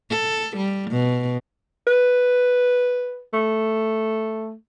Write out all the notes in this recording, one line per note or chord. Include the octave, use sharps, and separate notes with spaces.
A4
G3
B2
B4
A3